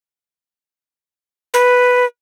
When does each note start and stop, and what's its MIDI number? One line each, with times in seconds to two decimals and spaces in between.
1.54 2.05 71